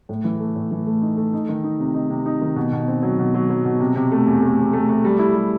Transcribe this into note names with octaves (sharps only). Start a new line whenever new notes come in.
A2
E3
A3
A2
E3
A3
D#4
A3
D#4
D#3
D#4
C3
D#4
C3
D#4
D#3
B2
B2
C4
F#3
B2
F#3
F#3
B2
C3
C3
A3
E2
A3
E2
A3
A3
G3
E4
G3